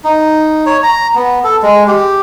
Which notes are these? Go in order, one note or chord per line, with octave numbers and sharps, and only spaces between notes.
D#4
C#5
A#5
B3
A4
G#3
G4